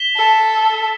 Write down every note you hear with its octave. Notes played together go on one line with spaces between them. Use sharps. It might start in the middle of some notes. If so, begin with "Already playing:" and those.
Already playing: B6 E7 G7
A4